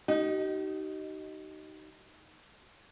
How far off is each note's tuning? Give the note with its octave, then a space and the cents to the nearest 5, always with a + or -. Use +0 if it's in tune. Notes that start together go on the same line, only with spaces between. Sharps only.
D#4 +0 G4 -45